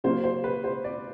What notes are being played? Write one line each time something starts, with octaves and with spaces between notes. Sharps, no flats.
C#3 F#3 A#3 C5
C5
B4
C5
D5